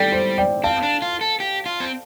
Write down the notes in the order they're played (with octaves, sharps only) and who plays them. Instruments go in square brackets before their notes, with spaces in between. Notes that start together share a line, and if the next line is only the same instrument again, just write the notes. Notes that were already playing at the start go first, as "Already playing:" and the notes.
Already playing: [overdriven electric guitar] G3 [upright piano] A4 D5 G5
[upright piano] C5
D5 G5
[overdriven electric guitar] C4 [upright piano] F5 A5
[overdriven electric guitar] D4
F4
A4
G4
F4
C4